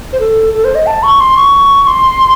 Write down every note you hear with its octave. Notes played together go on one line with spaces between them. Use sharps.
C5
A4
A4
C5
D#5
A5
C#6
C6
C#6
C6